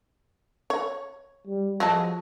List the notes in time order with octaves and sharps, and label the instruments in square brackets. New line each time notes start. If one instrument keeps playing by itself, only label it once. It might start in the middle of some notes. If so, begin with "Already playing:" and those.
[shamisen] C#5
[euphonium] G3
[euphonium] F3 [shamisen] F#3 G#3 A5